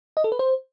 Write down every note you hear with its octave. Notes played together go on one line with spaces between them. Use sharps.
D#5
A4
B4
C5